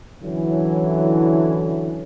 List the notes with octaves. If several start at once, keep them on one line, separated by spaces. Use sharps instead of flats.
D3 E3 F#3 C#4 E4